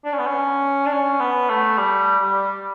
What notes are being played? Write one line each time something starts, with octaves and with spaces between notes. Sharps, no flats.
D4
C#4
B3
C#4
D4
C#4
B3
A3
G3
G3